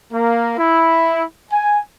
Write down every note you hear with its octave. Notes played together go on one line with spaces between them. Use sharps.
A#3
E4
G#5